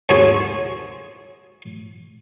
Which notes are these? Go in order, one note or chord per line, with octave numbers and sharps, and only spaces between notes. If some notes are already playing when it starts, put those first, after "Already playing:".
D#2 G#2 C4 F#4 G#4 C#5